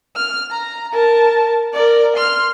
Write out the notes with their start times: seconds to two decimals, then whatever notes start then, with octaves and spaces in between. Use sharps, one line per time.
0.16 F6
0.51 A#5
0.92 A#4 A5
1.73 A#4 D5
2.17 C6 F6